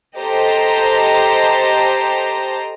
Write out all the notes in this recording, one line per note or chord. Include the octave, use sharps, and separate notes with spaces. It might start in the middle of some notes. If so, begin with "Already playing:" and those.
G4 A4 C5 D#5 A5 A#5